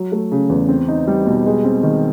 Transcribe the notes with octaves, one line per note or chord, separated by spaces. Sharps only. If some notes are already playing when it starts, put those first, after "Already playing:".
Already playing: F#3
A3
C#3
E2
C4
D#4
G3
B2
G#3
C4
D#3